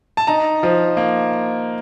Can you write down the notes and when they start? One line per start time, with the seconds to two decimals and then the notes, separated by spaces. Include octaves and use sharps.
0.17 A5
0.27 D#4 A#5
0.63 F3
0.97 A#3